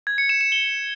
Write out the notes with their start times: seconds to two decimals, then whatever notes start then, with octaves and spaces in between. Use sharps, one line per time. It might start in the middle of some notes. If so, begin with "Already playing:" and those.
0.07 G#6
0.18 C#7
0.29 E7
0.41 E7
0.52 G7